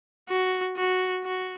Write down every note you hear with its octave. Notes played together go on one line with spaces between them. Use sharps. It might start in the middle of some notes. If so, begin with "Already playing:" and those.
F#4
F#4
F#4